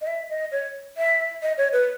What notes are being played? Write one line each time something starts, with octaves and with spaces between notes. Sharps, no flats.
D#5
E5
D#5
C#5
E5
D#5
C#5
B4